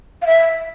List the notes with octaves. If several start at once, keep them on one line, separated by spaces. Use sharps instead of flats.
F5
E5